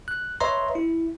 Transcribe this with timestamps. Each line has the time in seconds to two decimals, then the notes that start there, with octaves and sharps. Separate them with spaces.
0.08 F#6
0.40 B4 C#5 D#5 E5 A#5 C6
0.75 E4